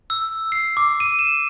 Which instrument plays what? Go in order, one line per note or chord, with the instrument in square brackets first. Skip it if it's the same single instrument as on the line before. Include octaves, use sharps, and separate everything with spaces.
[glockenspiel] E6
C7
D6
D#7
E7